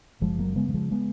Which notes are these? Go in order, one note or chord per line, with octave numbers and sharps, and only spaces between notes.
F#1 F3 G#3
F#3 A#3
C#3 G#3 B3
F#3
F3 G#3
G#3 B3